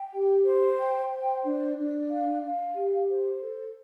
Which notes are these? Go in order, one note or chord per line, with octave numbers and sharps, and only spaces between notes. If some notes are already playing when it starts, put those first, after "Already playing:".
Already playing: G5
G4
C5
G5
C5
D4
D4
F5
F5
G4
C5
A4